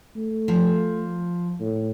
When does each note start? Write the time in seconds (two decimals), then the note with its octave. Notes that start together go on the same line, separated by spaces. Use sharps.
0.16 A3
0.48 F3
1.60 A2